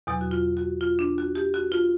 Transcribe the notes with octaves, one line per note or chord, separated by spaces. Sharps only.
E2 B2 F#3 E4
F#4
F4
F#4
F4
D4
F#4
G4
F#4
F4